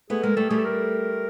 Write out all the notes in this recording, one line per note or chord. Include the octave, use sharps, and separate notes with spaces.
A3 B3 G#4
G#3 A#3 A#4
G3 A3 A4
G3 A3 G#4
A4
A#4